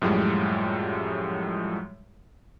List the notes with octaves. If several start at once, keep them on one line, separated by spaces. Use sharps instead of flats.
F#2 A2 F3 G3 G#3